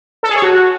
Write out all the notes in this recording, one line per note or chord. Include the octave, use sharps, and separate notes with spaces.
A4
G#4
C#5
F#4